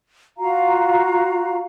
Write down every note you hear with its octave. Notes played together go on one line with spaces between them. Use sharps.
F4 F#4 F5 A#5